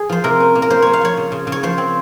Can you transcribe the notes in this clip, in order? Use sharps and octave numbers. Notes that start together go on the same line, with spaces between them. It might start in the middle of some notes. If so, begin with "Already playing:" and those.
Already playing: G#4
F3 C5
C3 A#4
C#4
A#3
A#4
A#3 C5
A#3 C#5
F5
F3 C#5
C#3
C#3
C#3
C#5
F3 C5
C4